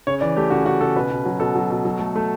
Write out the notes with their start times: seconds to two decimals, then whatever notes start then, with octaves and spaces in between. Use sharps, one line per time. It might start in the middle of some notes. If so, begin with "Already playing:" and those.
0.07 C#3 C#5
0.21 E3 D5
0.36 A3 G4
0.50 C#3 F#4
0.66 C#3 F#4
0.81 C#3 A4
0.95 B2 B4
1.11 B2
1.26 F#3
1.40 B2 A4
1.55 F#3
1.70 B2
1.85 F#3
2.00 A3
2.15 A3